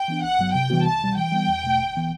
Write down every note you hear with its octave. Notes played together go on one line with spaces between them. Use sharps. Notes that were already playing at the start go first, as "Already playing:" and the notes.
Already playing: G5
E3 B3 D4
G1 F#5
G2 F#3 B3
C3 G5
E3 G3 B3 F#4
C2 A5
B2 G3
E3 G5
G3 B3
E2
B2 A3
G1
E3 B3